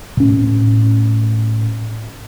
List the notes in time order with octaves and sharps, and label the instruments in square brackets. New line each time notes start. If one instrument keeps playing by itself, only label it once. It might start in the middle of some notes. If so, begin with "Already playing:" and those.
[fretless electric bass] A2 C#4